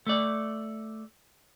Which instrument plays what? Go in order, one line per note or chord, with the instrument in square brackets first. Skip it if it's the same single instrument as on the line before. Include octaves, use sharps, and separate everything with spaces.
[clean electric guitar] A3 D5